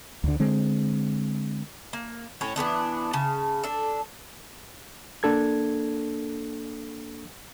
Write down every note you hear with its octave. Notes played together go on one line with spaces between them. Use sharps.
D2 D3
D3 G#3 C4
A#3
A2 C#4 C#5 A#5
E3 G3 B3 D4
C#3 A5
D4 A4
A#3 D4 A4 G#6